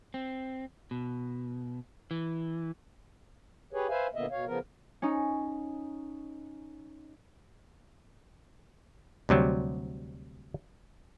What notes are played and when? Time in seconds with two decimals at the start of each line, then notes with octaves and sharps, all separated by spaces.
0.14 C4
0.91 B2
2.11 E3
3.73 G4 G#4 B4 C#5
3.89 B4 C5 E5 F5 G#5
4.15 A#2 D3 A#3 B3 D#5 E5
4.31 B2 C#5 F5
4.46 C#3 F3 B3 A#4
5.02 C#4 D#4
9.29 D2 C3 F#3 G3